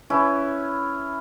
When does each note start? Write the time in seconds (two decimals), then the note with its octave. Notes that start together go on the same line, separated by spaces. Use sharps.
0.10 C#4 E4 B4